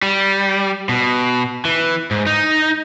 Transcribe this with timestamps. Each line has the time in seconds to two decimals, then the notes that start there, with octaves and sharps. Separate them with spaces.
0.02 G3
0.89 B2
1.65 E3
2.11 G#2
2.26 D#4